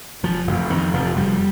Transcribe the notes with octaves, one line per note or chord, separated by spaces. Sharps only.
F1 F3
F1
F2 D#3
F1 F3
F1 G3